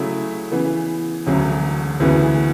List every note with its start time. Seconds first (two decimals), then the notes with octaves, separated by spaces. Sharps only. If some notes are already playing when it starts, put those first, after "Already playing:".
Already playing: C#3 F#3 A3 E4
0.52 C#3 E3 B3
1.26 E1 D2 C#3 F#3
2.00 D2 C#3 E3 B3 F#4